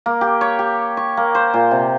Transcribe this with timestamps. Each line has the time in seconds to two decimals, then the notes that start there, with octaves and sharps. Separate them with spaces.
0.06 A#3
0.21 G4
0.41 C#5
0.59 G4
0.97 C#6
1.17 A#3
1.35 C5
1.54 A#2
1.71 C3